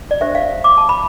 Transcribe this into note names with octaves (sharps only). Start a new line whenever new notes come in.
D5
D4 G4 C5 E5
F5
D6
A5
B5